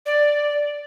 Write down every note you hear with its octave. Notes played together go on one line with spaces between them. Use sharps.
D5